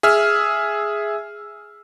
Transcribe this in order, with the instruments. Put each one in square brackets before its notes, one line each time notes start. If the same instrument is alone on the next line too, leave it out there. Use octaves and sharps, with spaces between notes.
[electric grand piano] G#4 E5 E6 F6